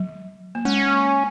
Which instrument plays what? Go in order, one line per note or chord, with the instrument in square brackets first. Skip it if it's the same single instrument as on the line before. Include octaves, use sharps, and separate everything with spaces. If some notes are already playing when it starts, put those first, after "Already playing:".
Already playing: [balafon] F#3
A#3
[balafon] G#3 [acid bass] C#4